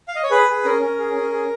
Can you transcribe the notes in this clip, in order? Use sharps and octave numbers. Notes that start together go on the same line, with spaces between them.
F5
D#5
C#5
G#4 B4
G#4
C#4 A#4
C#4
G#4
C#4
G#4